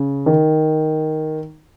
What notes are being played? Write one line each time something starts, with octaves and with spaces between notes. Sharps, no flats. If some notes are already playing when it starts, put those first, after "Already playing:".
Already playing: C#3
D#3